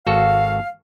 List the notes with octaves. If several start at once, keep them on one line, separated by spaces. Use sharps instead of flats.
G#1 F#4 A4 F5